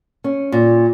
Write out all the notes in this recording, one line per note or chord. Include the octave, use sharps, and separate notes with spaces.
C#4
A#2